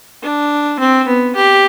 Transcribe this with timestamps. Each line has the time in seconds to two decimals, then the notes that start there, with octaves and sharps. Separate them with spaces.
0.23 D4
0.79 C4
1.07 B3
1.35 G4